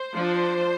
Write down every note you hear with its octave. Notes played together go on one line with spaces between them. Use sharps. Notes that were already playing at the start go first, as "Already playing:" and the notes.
Already playing: C5
F3 D4